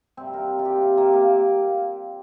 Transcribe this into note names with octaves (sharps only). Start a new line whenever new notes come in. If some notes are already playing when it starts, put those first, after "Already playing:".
C3 G3 A#3 C4
A#4
F4
G4
C4
A#3
A#3